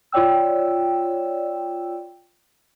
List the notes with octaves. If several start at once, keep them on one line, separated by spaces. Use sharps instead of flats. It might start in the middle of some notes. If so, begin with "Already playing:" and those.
F4 C#5 D5 G5 E6